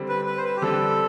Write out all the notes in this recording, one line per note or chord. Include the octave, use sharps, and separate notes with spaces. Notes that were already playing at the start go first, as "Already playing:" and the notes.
Already playing: D3 G3 C4
B4
B4
C5
B4
G4
D3 G3 C4 A4